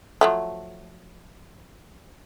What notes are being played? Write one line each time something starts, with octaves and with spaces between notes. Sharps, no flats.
F3 F#3 A3